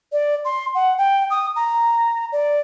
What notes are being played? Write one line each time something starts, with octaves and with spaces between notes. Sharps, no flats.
D5
C6
F#5
G5
D#6
A#5
D5